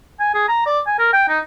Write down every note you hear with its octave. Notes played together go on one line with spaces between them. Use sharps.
G#5
G#4
A#5
D5
G#5
A#4
G5
D#4